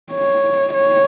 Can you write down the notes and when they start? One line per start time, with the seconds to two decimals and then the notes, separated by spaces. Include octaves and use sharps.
0.13 C#5
0.74 C#5